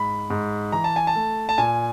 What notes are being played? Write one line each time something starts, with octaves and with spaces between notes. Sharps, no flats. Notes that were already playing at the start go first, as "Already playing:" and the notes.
Already playing: G#2 B5
G#2
E3 A#5
A5
G#5
A5
A3
A5
A#2 G#5